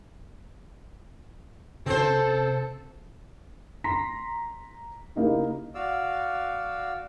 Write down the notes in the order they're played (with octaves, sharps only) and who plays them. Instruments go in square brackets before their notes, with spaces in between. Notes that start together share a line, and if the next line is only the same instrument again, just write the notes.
[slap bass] C3 C#4 [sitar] C4 C5 [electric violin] A4
[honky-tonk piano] A#5 C6 A#6 B6
C#3 A#3 D#4 E4 G4
[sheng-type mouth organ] F#4 D5 F5 E6